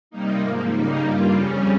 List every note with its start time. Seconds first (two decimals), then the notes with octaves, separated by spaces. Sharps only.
0.11 C3 G3 A#3 D#4
0.40 G#2 F3 A#3
0.71 C#3 G3 A#3 D#4
1.01 G2 G3 A#3 F4
1.31 F2 C#3 G3 C#4